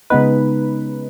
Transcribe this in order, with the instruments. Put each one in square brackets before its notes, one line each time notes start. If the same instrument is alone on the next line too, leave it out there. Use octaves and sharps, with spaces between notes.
[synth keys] C#3 G#3 B3 D#4 B4